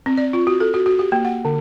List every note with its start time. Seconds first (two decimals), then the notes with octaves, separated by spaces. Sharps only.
0.06 C4
0.18 D5
0.33 F4
0.47 F#4
0.61 A4
0.74 F#4
0.86 F#4
0.99 G4
1.12 A#3
1.25 F#5
1.45 D3